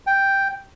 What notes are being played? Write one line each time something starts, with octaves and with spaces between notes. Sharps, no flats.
G5